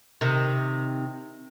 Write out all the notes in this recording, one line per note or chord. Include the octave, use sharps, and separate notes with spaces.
C3 D#3